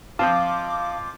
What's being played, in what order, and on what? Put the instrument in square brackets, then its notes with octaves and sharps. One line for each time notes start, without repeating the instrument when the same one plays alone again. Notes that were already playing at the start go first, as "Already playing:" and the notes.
[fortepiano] F3 C4 F4 [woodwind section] D#5 C6 D6 [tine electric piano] F5 A5